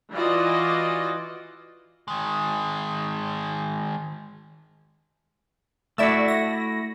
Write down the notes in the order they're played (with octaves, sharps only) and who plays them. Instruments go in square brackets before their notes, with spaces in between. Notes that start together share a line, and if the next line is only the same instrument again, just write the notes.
[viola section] E3 F4 F#4 D5 D#5
[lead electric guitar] D#3 G#3
[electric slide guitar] A3 E4 F#4 [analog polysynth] D5 E5 E6
[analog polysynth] A#6